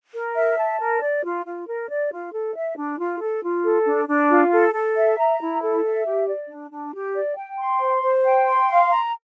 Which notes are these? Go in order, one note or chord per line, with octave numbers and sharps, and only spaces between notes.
A#4
E5
A5
A#4
D5
F4
F4
A#4
D5
F4
A4
E5
D4
F4
A4
F4
A4
D4
D4
F4
A4
A4
E5
A#5
E4
A4
E5
G4
D5
D4
D4
G4
D5
G5
C6
C5
C5
G5
C6
F5
A#5